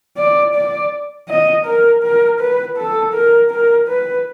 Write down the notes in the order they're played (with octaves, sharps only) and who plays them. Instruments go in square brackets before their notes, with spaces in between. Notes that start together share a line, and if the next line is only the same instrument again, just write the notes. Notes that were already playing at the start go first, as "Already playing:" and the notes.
[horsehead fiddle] D5
D5
D#5
A#4
A#4
B4
A4
A#4
A#4
B4